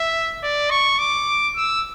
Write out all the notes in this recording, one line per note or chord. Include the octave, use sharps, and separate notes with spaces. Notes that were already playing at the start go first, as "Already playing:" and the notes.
Already playing: E5
D5
C#6
D6
E6